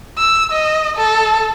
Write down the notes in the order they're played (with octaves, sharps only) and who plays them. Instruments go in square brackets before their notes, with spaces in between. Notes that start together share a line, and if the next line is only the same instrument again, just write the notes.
[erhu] E6
D#5
A4